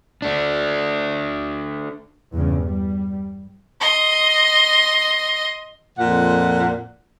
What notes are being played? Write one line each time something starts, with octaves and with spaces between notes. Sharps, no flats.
A3 D4
E2 G2 C#3
G3
D#5 C6
F2 A#2 F#5